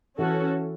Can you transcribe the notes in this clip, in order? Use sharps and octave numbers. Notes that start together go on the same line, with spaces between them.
E3 C#4 F#4 A4